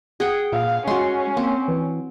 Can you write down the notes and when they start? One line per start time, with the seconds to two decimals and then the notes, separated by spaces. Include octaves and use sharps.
0.20 G#4 F#5 G5
0.52 A#2 F5
0.87 G#3 C#4 F#4 C6
1.37 A#3 C4
1.68 E3